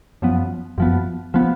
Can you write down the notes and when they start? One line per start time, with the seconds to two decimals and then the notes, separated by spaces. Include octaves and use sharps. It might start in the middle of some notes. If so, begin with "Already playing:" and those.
0.22 F#2 F3 B3
0.78 F#2 F3 B3
1.34 F3 B3